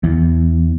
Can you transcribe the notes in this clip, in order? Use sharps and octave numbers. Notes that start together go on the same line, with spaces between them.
E2